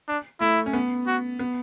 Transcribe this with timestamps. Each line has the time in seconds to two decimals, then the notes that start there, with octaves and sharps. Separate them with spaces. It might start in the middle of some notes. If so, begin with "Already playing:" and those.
0.08 D4
0.41 A3 E4
0.66 C#4
0.73 B3
1.07 F#4
1.39 B3